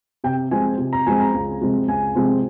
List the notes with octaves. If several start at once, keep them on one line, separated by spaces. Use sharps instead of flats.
C3 G5
F3 G#3 C4 G#5
C3
A#5
F3 G#3 C4 G#5
A#5
C#2
C3 F3 G#3 C4
C#2 G#5
C3 F3 G#3 C4